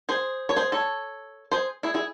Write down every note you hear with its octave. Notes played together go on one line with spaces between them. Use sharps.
G#4 C5
C#5
G#4 C5
A4 C#5
G#4 C5
E4 G#4
E4 G#4